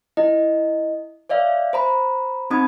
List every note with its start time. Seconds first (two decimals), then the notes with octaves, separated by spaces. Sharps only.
0.17 E4 D#5
1.29 C#5 D5 E5 F5
1.73 C5 A#5 B5
2.50 C4 D#4 B5 D#6 G#6